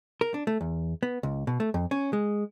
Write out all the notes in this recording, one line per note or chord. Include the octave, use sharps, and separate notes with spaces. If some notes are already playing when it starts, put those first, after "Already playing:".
A#4
D4
A3
E2
B3
C#2
B2
A3
F2
C#4
G#3